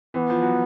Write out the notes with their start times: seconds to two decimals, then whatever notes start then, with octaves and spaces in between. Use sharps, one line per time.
0.14 E3 B3
0.30 F3
0.42 F#3